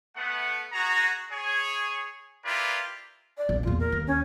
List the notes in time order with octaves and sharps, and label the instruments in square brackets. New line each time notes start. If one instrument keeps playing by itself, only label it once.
[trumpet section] A3 B3 F#5
F#4 G#4 A#5
G#4 C#5 G#5
E4 F4 G4 A#4 B4 D5
[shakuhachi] D5
[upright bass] A#1
[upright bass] E2 A#2 [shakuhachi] F4
[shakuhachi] A#4
[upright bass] D#2
[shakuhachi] C#4